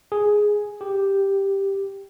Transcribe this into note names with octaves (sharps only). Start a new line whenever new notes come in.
G#4
G4